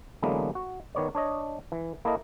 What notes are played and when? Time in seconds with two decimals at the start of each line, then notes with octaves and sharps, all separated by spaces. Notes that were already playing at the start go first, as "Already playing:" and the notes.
0.22 D3 E3 F#3 G#3 A#3 B3
0.55 F#4
0.95 D#3 B3 C#5 D5
1.15 D4 C#5 D#5
1.72 E3
2.05 A#3 E4 A4 D#5